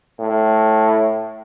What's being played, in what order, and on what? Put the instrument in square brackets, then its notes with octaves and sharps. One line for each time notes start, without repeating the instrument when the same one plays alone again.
[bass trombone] A2